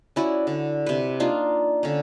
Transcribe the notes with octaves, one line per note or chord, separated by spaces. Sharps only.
C#4 E4 F#4 D5
D3
C3 B4
A#3 D4 D#4 F4
D3 C#4